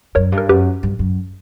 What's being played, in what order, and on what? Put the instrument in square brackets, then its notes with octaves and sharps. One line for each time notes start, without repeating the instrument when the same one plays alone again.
[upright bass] F#2 [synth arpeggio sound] A#4 C#5
[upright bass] G2
[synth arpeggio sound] A#4
[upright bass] F#2 [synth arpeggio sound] G4 B4
[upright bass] G2
F#2